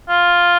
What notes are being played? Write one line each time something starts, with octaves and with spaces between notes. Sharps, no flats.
F4